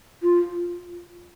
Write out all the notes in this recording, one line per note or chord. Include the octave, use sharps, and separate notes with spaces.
F4